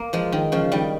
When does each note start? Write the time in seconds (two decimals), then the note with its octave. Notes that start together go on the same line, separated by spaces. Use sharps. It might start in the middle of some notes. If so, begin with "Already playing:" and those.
Already playing: A#3
0.13 F3 G#3
0.32 D#3
0.52 C#3 F3
0.72 D#3 G3